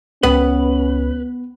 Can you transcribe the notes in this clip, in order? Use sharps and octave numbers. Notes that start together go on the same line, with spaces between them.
C#2 B3 C#4 B4